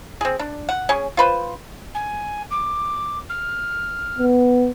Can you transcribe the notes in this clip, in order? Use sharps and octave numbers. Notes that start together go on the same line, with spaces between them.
C4 G#4
D4
F#5
C#4 G#4
F4 B4 C5
G#5
D6
F6
B3